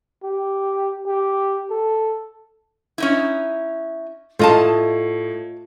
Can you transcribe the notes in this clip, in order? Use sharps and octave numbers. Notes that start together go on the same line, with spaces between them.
G4
G4
A4
C#4 D#4 E4
A2 F4 D#5 A5